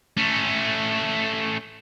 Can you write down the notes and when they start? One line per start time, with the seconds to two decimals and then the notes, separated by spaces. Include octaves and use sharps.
0.17 A3 C#4